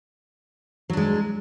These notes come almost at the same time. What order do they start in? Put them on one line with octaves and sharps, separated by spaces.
F#3 D4 G#3